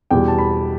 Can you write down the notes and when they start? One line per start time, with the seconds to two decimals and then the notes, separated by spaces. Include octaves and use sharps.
0.11 E2 B2 G3 G5
0.28 A5
0.38 B5